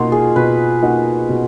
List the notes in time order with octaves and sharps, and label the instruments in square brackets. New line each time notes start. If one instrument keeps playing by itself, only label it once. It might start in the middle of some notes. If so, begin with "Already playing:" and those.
Already playing: [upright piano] B2 A#3 D#4 F#4 [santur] F4
[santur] G#4
[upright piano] B2 [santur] B4
[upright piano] A#3 D#4 F#4
B2